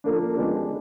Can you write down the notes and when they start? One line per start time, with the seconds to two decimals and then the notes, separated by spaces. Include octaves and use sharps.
0.04 F3 A#3 D4
0.36 F3 G#3 B3 D4 G4